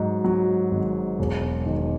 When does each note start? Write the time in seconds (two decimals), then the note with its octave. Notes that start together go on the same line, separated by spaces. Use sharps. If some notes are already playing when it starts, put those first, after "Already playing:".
Already playing: G#2 F#3
0.24 F#3
0.71 G#1
1.19 E1
1.66 D#3